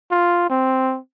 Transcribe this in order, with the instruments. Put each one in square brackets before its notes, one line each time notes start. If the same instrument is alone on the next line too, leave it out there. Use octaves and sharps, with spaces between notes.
[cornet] F4
C4